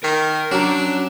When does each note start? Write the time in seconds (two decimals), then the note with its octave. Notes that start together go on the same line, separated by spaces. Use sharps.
0.04 D#3 A#4
0.52 F#3 C#4 D4 A#5